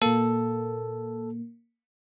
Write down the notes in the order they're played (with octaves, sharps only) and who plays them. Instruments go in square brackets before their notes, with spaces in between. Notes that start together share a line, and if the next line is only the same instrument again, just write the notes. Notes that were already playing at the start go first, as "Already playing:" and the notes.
[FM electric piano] A#2 A#3 [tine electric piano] A4